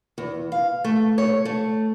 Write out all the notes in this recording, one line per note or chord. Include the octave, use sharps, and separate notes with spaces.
E2
F5
A3
C#5
A3